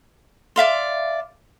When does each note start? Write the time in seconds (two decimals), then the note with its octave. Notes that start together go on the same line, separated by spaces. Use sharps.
0.56 D5 E5 F5 C6